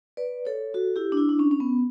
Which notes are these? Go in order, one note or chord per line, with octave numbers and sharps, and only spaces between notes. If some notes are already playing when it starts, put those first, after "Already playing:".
B4 D5
A4 C#5
F#4 A4
E4 G4
D4
E4
D4
C#4
C#4
B3